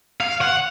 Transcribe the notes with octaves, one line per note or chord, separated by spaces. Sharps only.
F5
F#5